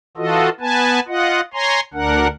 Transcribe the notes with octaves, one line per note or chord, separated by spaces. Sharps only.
E3 F4 F#4 A4 D#5
B3 B4 G#5 A5
F4 D#5 F#5
C#5 G#5 A#5 C6
D2 D4 A#4 F#5